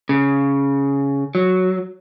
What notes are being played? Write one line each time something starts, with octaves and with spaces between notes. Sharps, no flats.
C#3
F#3